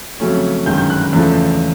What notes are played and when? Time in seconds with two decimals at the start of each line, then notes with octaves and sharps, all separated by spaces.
0.20 F2 C#3 F#3 A3 C#4
0.66 G1 F#2 D#3 G#3 G6
0.78 G6
0.90 F#6
1.02 F#6
1.13 E2 C#3 F3 A3